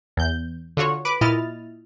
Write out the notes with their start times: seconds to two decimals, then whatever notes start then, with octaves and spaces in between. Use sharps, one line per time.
0.17 E2 G6
0.77 D3 F4 F#4 C#5
1.05 B4 D6
1.21 A#2 E4 D#5 F6 A6